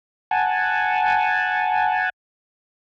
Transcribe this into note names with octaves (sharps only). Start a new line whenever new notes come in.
F#5 G#5 A5